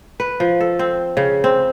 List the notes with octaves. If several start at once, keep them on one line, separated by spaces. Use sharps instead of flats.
B4
F3
A4
C4
C#3
C4